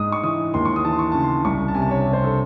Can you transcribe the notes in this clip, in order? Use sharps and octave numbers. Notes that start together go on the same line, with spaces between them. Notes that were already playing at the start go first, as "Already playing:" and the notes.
Already playing: G#2 G#3 D#6
C#6
E3 D#6
D#2 C6
C#6
D#6
E3 A5
C6
C#6
C#3 A5
C6
C2 C#6
A5
C3 G#5
A5
C#5
C3
C5
A4